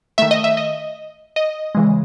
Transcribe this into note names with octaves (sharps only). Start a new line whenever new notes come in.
D#3 A3 E5
D#5
E5
D#5
D#5
C#3 E3 G#3